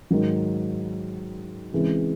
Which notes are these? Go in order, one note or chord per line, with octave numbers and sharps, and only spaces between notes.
G#2 D#3 F#3
C#3 E3 G#3 C4